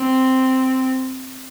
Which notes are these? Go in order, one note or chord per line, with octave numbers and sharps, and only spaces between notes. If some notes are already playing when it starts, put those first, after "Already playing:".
Already playing: C4